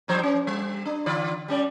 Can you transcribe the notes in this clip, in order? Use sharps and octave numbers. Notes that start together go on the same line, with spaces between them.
G2 F3 C5
C#4
G3
D4
D3 F4 D5
G3 C#4 D5